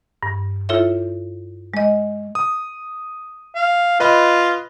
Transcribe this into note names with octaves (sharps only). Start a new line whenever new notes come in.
G2
E4 F4 A4 C#5 E5
G#3 D#5
D#6
F5
F4 B4 D#5 B5